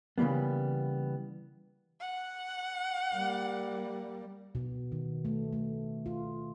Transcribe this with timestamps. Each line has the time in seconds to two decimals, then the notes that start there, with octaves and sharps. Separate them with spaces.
0.18 C#3 E3 G3 A#3 B3
2.00 F#5
3.15 G3 A#3
4.55 B2
4.92 D#3
5.25 A3
5.53 A3
6.06 F4